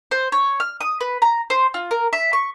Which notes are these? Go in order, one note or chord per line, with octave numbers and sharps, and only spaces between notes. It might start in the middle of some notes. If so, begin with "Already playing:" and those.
C5
C#5
F6
D#6
B4
A#5
C5
F4
A#4
E5
C#6